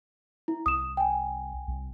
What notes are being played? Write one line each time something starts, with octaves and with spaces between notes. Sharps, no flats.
E4
C2 D#6 E7
G5 G#5
C2